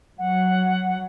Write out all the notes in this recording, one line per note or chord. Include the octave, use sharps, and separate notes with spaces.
F#3 F#5